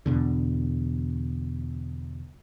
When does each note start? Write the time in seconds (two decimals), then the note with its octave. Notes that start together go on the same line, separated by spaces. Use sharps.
0.06 E2 B2 D3